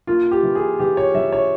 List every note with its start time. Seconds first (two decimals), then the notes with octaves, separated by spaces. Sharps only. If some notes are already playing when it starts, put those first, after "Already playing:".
0.07 A#3 F4
0.31 G4
0.43 E3
0.55 G#4
0.79 E3 G4
0.97 C#5
1.15 E3 E5
1.32 C#5